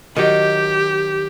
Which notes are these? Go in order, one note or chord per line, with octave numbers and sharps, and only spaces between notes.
D#3 F#3 G4